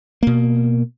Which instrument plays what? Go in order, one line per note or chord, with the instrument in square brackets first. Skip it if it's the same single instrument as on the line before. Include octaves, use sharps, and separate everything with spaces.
[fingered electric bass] B2 A#3